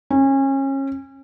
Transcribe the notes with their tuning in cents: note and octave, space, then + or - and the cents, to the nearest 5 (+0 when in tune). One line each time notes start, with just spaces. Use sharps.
C#4 -30